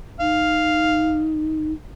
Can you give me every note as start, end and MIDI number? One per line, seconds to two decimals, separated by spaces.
0.20 1.73 63
0.20 1.25 77